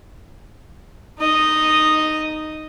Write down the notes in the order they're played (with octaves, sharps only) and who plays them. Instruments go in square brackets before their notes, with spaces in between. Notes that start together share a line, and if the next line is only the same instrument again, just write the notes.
[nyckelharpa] D#4 D#5